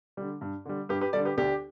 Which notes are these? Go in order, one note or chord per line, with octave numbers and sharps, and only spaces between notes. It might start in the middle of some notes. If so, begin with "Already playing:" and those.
D3 G3
G2
D3 G3
G2 G4 B4
G4 B4
D3 G3 A4 D5
G4 B4
D2 D4 G4